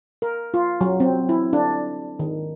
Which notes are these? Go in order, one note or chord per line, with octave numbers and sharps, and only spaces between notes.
A#4
F4
F#3
C4
E4
D4
D#3